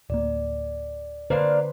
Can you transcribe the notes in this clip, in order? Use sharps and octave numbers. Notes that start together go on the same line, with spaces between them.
D1 A#3 D5
D3 A#3 D4 B4 C5 F5